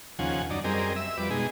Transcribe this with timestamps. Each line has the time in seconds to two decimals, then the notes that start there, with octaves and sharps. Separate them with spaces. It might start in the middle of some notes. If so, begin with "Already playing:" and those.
0.19 D#2 C#3 F3 F#5 G#5
0.50 F#2 D4 D#4
0.64 F#2 G3 C4 G#4 A#4 D#5
0.96 E5 E6
1.17 F2 G3 B4 D6
1.30 B2 G#3 D#4 G#4